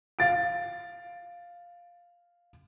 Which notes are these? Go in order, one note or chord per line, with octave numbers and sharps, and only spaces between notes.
F5 A6 D7